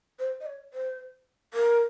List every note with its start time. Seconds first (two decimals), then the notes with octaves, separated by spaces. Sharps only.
0.19 C5
0.41 D#5
0.46 C#5
0.74 C5
1.54 A#4